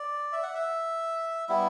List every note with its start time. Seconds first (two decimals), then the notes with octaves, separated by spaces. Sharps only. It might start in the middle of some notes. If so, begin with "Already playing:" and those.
Already playing: D5
0.33 E5
0.43 F#5
0.54 E5
1.49 G3 B3 E4 E5